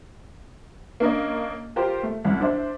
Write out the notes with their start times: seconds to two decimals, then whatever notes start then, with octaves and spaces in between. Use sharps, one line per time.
1.00 A#3 C#4 D4 A#4 C#5 D#5
1.76 F4 G4 A#4 C5
2.03 A3
2.25 C2 F#2
2.41 D4 C5 E5